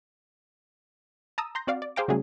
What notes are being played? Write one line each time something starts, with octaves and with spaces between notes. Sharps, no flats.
A5 A#5 D#6 E6
A#5 C6 G6 A#6
C4 F#4 D5 F5
D5
G#4 C5 F5 G5 A#5 D6
C#3 F#3 G3 A3 C#4 G#4